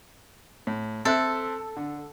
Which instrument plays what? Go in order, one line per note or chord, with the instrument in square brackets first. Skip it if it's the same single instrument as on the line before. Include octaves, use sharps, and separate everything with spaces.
[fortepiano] A2
[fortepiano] C4 E5 F#6 [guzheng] A4
[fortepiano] D3